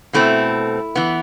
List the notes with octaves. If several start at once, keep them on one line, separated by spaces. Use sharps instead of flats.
B2 A3 C4 E4
E3 B3